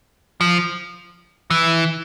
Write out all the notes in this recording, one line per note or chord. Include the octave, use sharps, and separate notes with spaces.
F3
E3